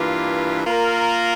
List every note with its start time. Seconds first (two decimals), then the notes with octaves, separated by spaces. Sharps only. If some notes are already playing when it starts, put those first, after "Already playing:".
Already playing: G2 E3 A#3 F4
0.65 A#3 F4 A#4